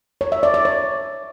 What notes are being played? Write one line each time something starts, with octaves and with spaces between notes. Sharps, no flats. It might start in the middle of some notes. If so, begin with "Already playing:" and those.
C#5
E5
D5
D5
C#5